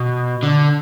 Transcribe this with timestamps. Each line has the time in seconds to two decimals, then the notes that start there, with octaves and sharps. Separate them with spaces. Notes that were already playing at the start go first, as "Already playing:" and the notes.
Already playing: B2
0.43 D3